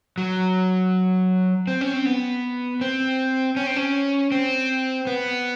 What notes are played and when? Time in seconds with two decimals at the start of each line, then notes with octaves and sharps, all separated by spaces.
0.18 F#3
1.67 C4
1.81 C#4
1.94 C4
2.05 B3
2.81 C4
3.57 C#4
3.67 C4
3.76 C#4
4.32 C4
5.07 B3